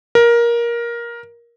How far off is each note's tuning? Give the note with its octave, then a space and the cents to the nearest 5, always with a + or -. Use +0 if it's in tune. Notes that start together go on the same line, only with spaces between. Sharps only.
A#4 +15